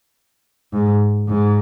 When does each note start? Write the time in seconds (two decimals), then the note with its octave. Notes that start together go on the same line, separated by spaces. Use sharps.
0.73 G#2
1.28 G#2